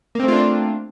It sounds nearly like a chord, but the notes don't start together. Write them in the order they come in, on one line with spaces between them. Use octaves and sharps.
A#3 C4 A3 F4 D4